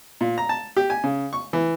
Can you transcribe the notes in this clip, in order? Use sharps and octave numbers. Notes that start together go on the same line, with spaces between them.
A#2
A#5
A5
G4
G#5
C#3
C#6
E3